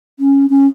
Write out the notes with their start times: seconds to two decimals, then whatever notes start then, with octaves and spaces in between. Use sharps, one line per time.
0.20 C#4
0.50 C#4